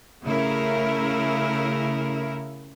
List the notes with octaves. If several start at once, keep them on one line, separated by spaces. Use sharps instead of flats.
C#3 A3 E4 A#4